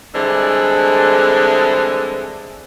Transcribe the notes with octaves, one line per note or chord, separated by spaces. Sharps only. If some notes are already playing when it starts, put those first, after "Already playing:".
D3 E3 G3 G#3 C4